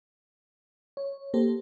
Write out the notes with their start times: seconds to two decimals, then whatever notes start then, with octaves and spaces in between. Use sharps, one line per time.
0.97 C#5
1.34 A#3 G4 A4 C5